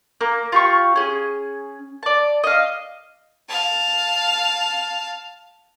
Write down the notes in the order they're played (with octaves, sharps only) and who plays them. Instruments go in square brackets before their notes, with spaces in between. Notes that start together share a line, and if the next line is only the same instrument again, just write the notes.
[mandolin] A#3
F4 G4 C#6
C#4 G#4
D5 A5
D#5 F5
[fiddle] F5 A5